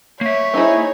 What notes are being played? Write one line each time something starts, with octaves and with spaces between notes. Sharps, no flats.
A#3 C#5 E5
C4 D#4 E4 G#4